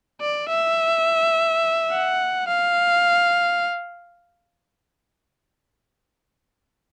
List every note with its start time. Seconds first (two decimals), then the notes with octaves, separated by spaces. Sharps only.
0.21 D5
0.48 E5
1.92 F#5
2.48 F5